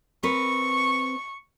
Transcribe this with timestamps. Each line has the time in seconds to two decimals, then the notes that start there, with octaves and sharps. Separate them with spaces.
0.23 C4 A#4 B4 C#6